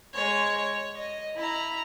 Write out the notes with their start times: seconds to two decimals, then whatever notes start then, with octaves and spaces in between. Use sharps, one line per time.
0.13 G#3 C#5
0.58 C#5
0.97 D#5
1.36 E4 A#5